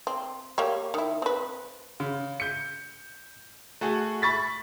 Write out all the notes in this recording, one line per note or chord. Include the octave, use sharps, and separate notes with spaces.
C4
A#3 G4 C#5
D#3 E4
C4 B4
C#3
G6 C#7
A3 F#4 G#4
B5 C#6 A6 B6